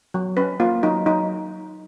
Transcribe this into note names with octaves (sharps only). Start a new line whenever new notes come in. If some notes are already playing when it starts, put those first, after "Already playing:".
F#3
C#4 B4
A#3 F4
F#3 D#4
F#3 D#4